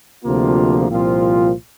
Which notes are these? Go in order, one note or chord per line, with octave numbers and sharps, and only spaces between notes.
D2 C3 F3 A#3 F4
C2 A#2 F3 C4 F4